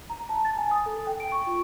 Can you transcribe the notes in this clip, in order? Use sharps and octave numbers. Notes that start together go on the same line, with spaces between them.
A#5
A5
A6
G#5
D#6
A4
G5
D7
C#6
F4